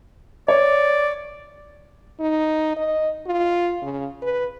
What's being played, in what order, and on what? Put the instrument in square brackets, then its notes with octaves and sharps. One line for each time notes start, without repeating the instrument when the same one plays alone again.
[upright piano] C#5 [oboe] D5
[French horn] D#4
D#5
F4
C#3
B4